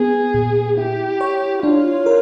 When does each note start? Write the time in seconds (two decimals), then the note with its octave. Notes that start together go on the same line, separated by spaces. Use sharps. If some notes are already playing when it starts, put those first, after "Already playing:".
Already playing: B3 G#4
0.34 A#2
0.77 E4 G4
1.21 C#5
1.63 D4 F4
2.06 A#4